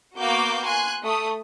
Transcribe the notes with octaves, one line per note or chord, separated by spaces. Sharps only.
A#3 B3 F#4 F5 D6 G6
G#5 C6 F#6
A3 D#6